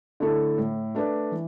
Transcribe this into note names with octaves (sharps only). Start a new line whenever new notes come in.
D3 A3 E4 A4
A2
A3 D4 B4 D5
E3